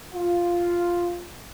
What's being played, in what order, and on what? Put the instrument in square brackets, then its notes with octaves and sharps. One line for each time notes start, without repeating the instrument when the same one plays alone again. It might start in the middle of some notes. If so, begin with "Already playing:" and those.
[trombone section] F4